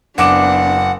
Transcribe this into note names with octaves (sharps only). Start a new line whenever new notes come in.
F#1 B3 D4 F#5 D6 E7